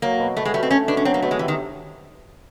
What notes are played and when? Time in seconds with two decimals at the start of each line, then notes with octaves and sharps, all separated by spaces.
0.02 F#3 A#3
0.19 B2
0.37 B2 A3
0.45 G#3
0.54 G3 A3
0.63 C4
0.71 A3 C#4
0.88 B2 D4
0.97 C#4
1.05 F#3 C4
1.14 A#3
1.22 B2 A3
1.31 G#3
1.39 C3 E3
1.48 D#3